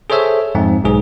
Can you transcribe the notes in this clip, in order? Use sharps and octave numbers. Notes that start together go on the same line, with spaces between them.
G#4 A4 C5 C#5 E5 E6
F2 G#2 C4
B1 G#2 G#4